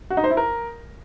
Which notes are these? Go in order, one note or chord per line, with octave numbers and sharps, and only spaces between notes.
F#4
D#4
C5
E4
A#4